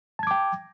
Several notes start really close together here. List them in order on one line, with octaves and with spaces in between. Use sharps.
A5 G#6 D6 G5